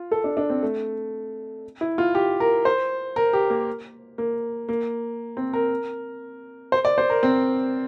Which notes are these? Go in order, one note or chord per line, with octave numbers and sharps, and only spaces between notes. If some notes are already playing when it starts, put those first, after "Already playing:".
Already playing: F4
A4
D4
D4
C4
A3
E4
F4
G4
A#4
C5
A#4
G4
A#3
A#3
A#3
C4
A#4
C5
D5
C5
A#4
C4